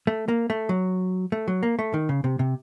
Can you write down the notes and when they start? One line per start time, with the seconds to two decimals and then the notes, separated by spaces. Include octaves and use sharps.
0.07 A3
0.28 A#3
0.50 A3
0.69 F#3
1.32 A3
1.48 F#3
1.63 A#3
1.79 A3
1.94 D#3
2.09 C#3
2.24 C3
2.39 C3